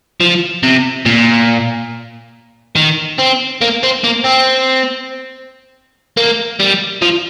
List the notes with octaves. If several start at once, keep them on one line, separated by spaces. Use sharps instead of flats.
F3
C3
A#2
D#3
C4
A#3
C4
A#3
C4
A#3
G3
F3